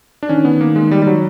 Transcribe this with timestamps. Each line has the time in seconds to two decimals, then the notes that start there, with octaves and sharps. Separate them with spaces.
0.23 D4
0.29 D#3 C#4
0.45 B3
0.61 A#3
0.76 G#3
0.91 G3
1.02 G3
1.07 F#3